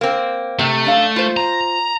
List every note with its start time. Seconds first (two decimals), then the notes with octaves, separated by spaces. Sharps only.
0.01 A#3 C4
0.59 C3 A3
0.84 F#2 D4 F5
1.16 F4 C5
1.37 A#5